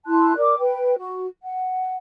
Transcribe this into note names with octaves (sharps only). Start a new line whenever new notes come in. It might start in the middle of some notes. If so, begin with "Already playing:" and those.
E4 A5 C6 F#6
A#4 D5 D6
B4 G5
F#4
F#5